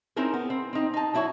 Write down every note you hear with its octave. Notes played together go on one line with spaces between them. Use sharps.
C4 C#4 D#4 E4 G#4 A#4
B3
C4
C4 D#4
D#4 A5
F#3 D4 E4 F#4 C#5